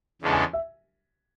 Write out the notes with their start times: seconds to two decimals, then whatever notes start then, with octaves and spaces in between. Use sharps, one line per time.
0.22 E2 C#3 G#3 D4 A4
0.32 G#5
0.53 E5